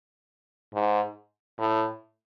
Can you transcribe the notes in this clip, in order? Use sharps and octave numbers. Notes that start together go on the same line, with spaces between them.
G#2
A2